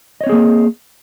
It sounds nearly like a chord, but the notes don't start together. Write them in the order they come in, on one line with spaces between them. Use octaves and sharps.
D#5 C#5 C4 G#4 A#3